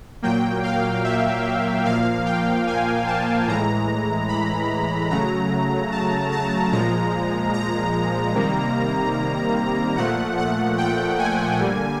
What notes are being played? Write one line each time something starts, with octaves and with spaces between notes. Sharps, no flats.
A#2 F#3 A#3 G5
F5
E5
A#2 F3 A#3 F5
G5
G#5
A5
A2 E3 G#3 A#5
B5
C#3 F#3 A3 A#5
A5
A5
A#2 F3 G#3 A#5
A#5
C3 D#3 G3 A#3
A#2 F3 A3 F#5
F#5
G5
G#5
D3 G3 A#3